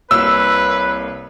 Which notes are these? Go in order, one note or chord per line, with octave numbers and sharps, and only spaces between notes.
C2 A#3 B4 C#5 E6